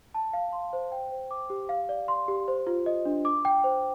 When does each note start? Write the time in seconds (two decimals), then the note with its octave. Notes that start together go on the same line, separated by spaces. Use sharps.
0.14 A5
0.33 F5
0.52 C6
0.73 C5
0.92 G5
1.12 C5
1.31 D6
1.50 G4
1.69 F5
1.89 D5
2.08 C6
2.28 G4
2.48 C5
2.67 F4
2.86 D#5
3.05 D4
3.25 D6
3.45 G5
3.64 C5